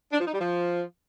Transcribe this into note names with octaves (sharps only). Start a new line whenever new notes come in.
D4
F3
D#4
G3
F3